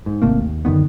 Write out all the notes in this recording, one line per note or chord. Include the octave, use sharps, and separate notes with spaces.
G#2
G#1 C3 A3 A#3
D#2
F#2 D3 D#3 B3